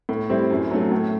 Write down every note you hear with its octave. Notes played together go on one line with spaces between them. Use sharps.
A2
G3 C4 E4
F#2
F#3 A3
A2